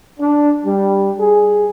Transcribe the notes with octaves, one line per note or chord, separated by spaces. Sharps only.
D4
G3
G#4